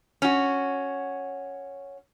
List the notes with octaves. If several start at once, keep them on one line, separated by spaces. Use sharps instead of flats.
C#4 F#4